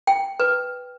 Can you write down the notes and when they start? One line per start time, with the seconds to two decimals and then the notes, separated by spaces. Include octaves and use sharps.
0.07 G5
0.40 B4